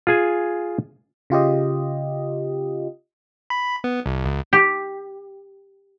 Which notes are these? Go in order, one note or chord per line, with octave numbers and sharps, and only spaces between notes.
F4 G#4 G#5
C#3 F4 G4 D#5
B5
B3
C2
C#2
G4